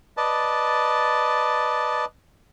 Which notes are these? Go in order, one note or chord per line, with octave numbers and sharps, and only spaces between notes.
B4 D5 D#5 A5